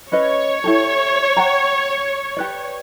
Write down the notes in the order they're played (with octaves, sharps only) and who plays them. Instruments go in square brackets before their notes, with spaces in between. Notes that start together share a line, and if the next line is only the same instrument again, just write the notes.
[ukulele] C#4 B4 D#5 [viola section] C#5
[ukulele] E4 G4 A4
F#5 G5 A#5
G4 B4 D5